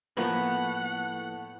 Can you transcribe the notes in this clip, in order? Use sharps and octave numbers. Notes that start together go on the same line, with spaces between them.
A2 F3 A#3 B3 B4 F#5